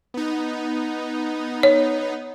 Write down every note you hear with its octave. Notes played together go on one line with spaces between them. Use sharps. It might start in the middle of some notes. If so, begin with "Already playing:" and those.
B3 D#4
C#5